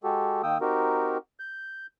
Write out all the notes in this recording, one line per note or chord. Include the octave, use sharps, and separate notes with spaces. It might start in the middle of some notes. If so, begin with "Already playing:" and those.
G#3 F#4 G4 A4
D#3 A#3 G5 D#6 E6
C4 D#4 F#4 G4 A#4
G6